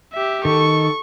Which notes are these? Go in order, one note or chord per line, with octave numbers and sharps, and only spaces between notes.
G4 E5
D#3 A4 C#6